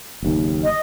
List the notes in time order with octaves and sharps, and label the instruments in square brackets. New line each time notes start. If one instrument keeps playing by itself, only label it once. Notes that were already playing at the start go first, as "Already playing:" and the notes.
[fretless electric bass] F#1 D#2
[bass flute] D#5